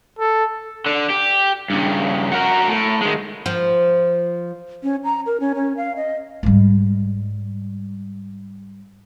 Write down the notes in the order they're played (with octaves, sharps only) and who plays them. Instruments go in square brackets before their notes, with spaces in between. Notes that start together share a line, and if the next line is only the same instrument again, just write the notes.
[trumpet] A4
[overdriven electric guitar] D3
G4
G2 C#3
F#4 A#4
A2
D#3 G#3
[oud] F3
[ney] C#4
A#5
A#4
C#4
C#4
F5
D#5
[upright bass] G#2 G3